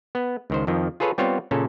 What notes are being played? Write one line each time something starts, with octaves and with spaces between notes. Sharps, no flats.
B3
C#2 D#3 C5
F2 D#3 F3
F4 G#4 A4 B4 C#5
G3 B3 C4 F4 C#5
A#2 C#3 C#4 A4